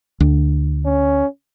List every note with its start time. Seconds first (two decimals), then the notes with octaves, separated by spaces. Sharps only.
0.20 D2
0.85 C#4